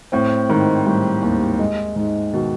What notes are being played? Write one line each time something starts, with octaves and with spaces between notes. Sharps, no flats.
A2 C4
G#2 D#3
A2 G3
D#2
G#3
G#2
B2 D#3